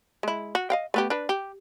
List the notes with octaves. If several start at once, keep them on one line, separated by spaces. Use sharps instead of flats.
G#3 E4
F#4
D#5 F5 G5
A3 B3 G4
D4 B4
G4